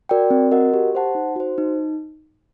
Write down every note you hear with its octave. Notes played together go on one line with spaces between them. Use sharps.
F#4 A#4 D5 G5
C4
F#4 A#4 D#5 F#5
G4
C5 F#5 A5
D#4
F#4 C5
D#4